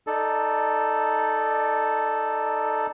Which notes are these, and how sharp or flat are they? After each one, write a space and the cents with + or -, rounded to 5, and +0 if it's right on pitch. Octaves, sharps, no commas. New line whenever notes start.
D#4 +0 A4 +0 D5 +15